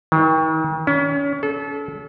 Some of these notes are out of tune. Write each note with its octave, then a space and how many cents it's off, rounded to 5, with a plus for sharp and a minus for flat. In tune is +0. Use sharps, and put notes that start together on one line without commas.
D#3 +40
C#4 +35
A4 -30